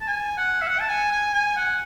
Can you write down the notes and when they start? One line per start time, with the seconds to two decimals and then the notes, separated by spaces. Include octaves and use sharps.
0.01 A5
0.08 G#5
0.37 F#5
0.62 E5
0.67 F#5
0.81 A5
0.89 G#5
1.12 G#5
1.33 G#5
1.56 F#5